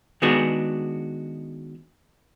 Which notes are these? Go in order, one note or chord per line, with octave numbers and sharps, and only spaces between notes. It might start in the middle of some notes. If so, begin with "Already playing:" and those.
D#3 G#3 B3 D4 F#4 G#4